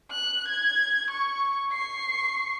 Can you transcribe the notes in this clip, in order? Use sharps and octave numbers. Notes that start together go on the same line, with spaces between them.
F#6
G#6
C#6
C#6 C7